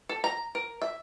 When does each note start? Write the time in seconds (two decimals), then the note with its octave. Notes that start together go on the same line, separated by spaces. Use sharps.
0.09 A4
0.24 A#5
0.55 A#4
0.82 E5